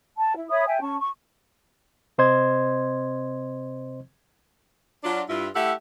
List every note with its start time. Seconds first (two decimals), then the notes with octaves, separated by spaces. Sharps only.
0.18 A5
0.36 E4
0.50 C#5 E5 B5 D#6
0.67 E5 G5 G#5
0.81 C#4 A5 C#6
1.00 C#6
2.18 C3 C4 C5 D#5 C6 G#6
5.04 F#3 D4 F4
5.29 G2 E4 F4
5.56 A3 E4 G4 A4 E5 F#5